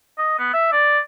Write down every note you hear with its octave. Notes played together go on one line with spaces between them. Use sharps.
D#5
B3
E5
D5